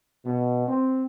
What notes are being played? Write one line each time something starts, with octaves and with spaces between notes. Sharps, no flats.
B2
C4